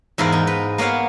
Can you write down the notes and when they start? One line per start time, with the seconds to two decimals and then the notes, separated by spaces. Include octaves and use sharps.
0.18 E2 G#2 E4 A#4 F5
0.32 D#4
0.47 B4
0.78 A#3 B3 C#5 F5 F#5